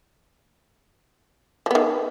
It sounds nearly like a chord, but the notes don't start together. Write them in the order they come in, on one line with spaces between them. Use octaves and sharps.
F3 B3 D#3